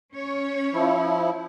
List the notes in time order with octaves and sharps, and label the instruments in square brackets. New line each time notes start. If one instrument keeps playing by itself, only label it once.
[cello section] C#4 C#5
[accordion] F3 E4